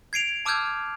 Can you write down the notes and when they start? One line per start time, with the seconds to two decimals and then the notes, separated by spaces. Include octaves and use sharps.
0.13 G#6 C7 D7 F7
0.46 A5 D6 E6 F6 G6 G#6